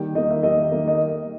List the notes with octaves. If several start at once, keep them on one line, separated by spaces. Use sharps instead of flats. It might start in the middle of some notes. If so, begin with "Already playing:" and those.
Already playing: D#3 G3 A#3 G5
D#3 G3 A#3 D#5
E5
D#3 G3 A#3 D#5
D#3 G3 A#3
D#5